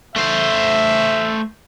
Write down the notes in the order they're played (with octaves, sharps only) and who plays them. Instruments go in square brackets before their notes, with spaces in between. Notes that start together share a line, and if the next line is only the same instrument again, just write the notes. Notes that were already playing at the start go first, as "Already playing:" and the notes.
[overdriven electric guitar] A3 C5 [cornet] E5